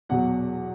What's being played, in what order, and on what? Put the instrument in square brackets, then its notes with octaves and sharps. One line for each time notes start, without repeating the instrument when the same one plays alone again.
[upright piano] E2 B2 F#3 F#5